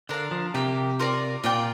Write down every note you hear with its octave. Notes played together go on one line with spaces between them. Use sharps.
D3 D4 A#4 F5
F3
C3 A#3 G4 A#4
F4 A#4 D5
A#2 F4 D5 G5